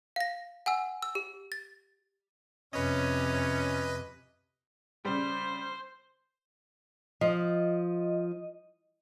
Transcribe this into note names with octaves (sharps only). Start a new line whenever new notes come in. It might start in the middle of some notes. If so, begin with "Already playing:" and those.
F5 A#6
F#5 G#5 E6
E6
G4
A6
F2 C3 C#4 B4 D#5
C#3 G3 C5
F3 D#5